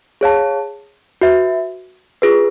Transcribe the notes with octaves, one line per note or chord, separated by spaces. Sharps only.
G#4 C#5 F5 A5
F#4 B4 E5
F4 G#4 B4